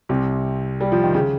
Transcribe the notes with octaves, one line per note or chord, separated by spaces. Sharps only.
C2 C3
G3
F3
D#3
C#3